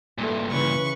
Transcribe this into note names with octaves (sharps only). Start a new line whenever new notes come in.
G2 A#2 A3
C#3 E3 B4 C#6